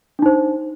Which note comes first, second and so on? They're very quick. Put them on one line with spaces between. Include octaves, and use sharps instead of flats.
D4 D#4 C5